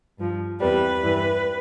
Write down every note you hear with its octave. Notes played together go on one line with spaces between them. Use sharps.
G2 F3
E2 C3 G3 B4
G2 E3 G3